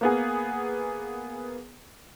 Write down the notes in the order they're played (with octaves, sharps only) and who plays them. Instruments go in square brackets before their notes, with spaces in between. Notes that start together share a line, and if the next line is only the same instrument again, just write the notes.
[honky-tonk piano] A#3 B3 G#4